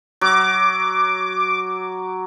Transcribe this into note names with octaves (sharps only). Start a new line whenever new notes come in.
F#3 D6